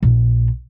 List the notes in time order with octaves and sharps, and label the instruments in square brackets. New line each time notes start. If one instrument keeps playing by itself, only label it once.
[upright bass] A#1